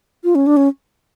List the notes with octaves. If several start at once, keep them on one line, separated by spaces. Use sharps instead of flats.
F4
C#4
D4
C#4